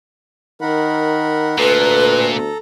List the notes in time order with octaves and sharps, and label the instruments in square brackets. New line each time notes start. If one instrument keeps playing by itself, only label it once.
[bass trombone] D#3 [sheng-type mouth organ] A#4 F#5 B5
[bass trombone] D2 [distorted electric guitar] A#2 [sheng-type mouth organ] A4 A#5 [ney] B4